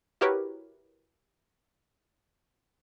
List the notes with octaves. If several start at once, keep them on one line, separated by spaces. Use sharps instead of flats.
E4 F#4 G4 A#4 B4 C#5